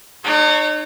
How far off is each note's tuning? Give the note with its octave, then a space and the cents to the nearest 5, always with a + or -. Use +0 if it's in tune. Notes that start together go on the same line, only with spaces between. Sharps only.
D#4 -40 C#5 +0